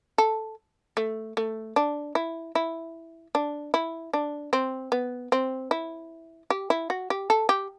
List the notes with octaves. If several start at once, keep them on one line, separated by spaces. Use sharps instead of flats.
A4
A3
A3
D4
E4
E4
D4
E4
D4
C4
B3
C4
E4
G4
E4
F#4
G4
A4
G4